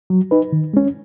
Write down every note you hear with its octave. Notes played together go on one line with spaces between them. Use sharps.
F#3
D#4 B4
D#3
G#3 C#4